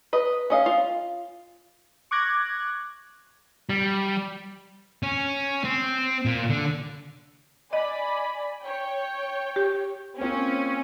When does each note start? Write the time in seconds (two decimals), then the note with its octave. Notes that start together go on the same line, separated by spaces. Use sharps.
0.13 B4 D#5
0.50 C#4 D#5 F5
0.66 F4
2.11 C#6 D6 F#6 G#6 A#6
3.69 G3
5.03 C#4
5.64 C4
6.25 A#2
6.50 D3
7.73 D5 D#5 G#5 B5
8.62 C#5 G5
9.56 G4
10.20 A#3 C4 C#4 F4